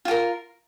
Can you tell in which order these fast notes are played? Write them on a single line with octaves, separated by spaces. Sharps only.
F4 G4 A#4